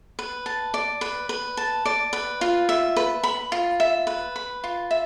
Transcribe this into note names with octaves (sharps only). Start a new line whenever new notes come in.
B4
A5
D5
B4
B4
A5
D5
B4
F4
E5
B4
B5
F4
E5
B4
B5
F4
E5